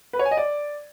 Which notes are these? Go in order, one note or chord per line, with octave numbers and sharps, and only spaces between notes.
B4
C#5
G#5
D#5
D5